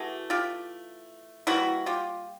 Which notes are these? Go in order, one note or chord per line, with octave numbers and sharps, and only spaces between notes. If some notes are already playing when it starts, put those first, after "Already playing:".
Already playing: E3 A3 F#4 G#4
F4 G4
E3 G3 A#3 E4 F#4
F4 G4